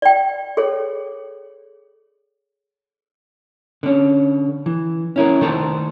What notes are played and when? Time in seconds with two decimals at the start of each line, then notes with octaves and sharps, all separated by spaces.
0.02 D5 G5
0.57 G#4 A4 C#5
3.83 D3 C#4
4.66 E3
5.16 C#4 E4 A#4
5.41 D#3 A3 A4 B4 C5